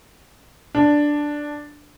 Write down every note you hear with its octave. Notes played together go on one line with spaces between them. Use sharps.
D4